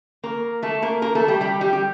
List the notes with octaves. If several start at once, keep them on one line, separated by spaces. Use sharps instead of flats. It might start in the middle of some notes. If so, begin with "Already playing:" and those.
A#3 A#4
A3 A4
A#3 A#4
A#3 A#4
A3 A4
G3 G4
G3 G4
G3 G4
G4